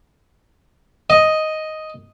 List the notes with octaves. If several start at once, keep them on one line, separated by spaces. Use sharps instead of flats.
D#5